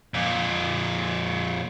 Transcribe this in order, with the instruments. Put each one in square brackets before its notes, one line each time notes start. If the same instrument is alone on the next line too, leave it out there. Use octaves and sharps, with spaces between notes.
[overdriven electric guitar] F2 A#2